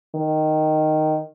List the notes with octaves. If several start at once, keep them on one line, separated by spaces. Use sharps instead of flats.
D#3